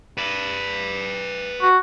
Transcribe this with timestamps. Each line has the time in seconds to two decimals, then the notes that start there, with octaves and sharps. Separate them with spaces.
0.18 B4 D5
1.62 F#4